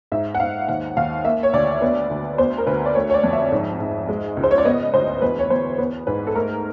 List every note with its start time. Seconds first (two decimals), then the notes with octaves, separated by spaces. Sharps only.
0.12 G#2 E5
0.35 F#5
0.40 G#2 F5
0.68 D#2 F#5
0.97 D#2 F5
1.25 A#3 E5
1.43 C#5
1.53 D2 D5
1.82 B3
2.10 D2
2.38 B3 C5
2.58 A#4
2.67 D2 B4
2.86 D5
2.95 A3 C#5
3.10 C#5
3.14 D5
3.23 F2
3.33 E5
3.52 G#2
3.80 G#2
4.09 G#3
4.37 C#2
4.43 C5
4.51 C#5
4.58 D5
4.65 B3 D#5
4.94 D2 C5
5.22 E2 B4
5.39 C#5
5.50 E2 C5
5.78 B3
6.07 G#2 B4
6.27 A4
6.35 A3 A#4